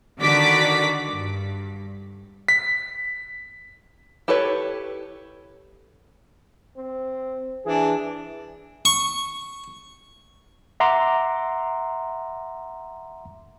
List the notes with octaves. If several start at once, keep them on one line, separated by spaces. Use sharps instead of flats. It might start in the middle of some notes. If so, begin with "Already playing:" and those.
D3 D#3 F#4 D5 D6 B6
G2
B6
E4 G4 A4 B4 C#5
C4
E3 D4 G#4
C#6
E5 F#5 A#5 C6 D6